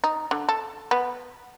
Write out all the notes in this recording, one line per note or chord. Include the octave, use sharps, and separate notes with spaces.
D#4
D3
A4
B3